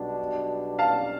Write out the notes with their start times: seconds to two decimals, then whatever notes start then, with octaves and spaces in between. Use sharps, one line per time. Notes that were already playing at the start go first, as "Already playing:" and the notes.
Already playing: B1 B2 G3 D4
0.79 F5 A5